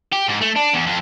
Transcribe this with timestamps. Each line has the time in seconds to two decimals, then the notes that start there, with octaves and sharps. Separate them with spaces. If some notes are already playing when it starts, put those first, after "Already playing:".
0.13 G4
0.29 G#2
0.42 A3
0.56 D4
0.74 E2
0.87 F2